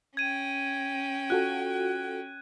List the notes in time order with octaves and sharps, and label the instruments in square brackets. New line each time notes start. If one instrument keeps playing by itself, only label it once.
[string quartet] C#4 G5 [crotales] G#6 D#7
[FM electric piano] F4 F#4 A4 [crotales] F#6